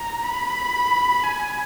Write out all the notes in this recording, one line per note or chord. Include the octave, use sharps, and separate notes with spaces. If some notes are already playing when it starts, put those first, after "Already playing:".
Already playing: A#5
B5
G#5